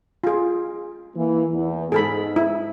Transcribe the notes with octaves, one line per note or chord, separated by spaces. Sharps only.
F4 G#4
E3 A#3
E2
G#2 G#4 A4 B5
E4